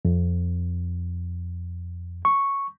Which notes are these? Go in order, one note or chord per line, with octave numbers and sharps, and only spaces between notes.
F2
C#6